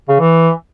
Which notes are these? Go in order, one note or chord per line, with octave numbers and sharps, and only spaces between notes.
C#3
E3